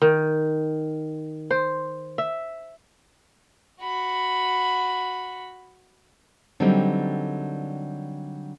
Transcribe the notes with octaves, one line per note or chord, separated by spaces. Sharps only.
D#3
C5
E5
F#4 B5
D3 F#3 G3 A#3 C4 D#4